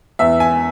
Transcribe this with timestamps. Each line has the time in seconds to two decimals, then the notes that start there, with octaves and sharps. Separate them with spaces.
0.19 E2 E5
0.40 G#5